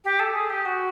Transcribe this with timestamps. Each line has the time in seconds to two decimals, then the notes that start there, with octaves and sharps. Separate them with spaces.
0.04 G4
0.19 A4
0.34 G#4
0.49 G4
0.65 F#4